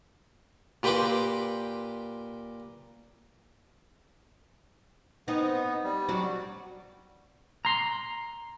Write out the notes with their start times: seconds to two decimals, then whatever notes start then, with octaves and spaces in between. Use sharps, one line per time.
0.83 A#2 G4 B4 G5 C6 D6
5.28 B3 C4 D#4
5.84 G3
6.09 F#3 D4 F#4
7.65 A#5 C6